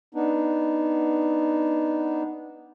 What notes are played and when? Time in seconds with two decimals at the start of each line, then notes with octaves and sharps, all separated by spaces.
0.14 B3 D4 D#4